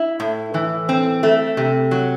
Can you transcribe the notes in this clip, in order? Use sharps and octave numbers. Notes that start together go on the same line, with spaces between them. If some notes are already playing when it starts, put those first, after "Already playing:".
Already playing: E4
A2
E3
C4
A3
C3
F#3